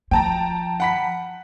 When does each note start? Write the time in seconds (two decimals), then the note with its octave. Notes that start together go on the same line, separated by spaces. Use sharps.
0.11 F3 G5 A5 A#5
0.80 F#5 B5 B6